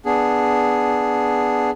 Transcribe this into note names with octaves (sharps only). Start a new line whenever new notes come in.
B3 D4 G#4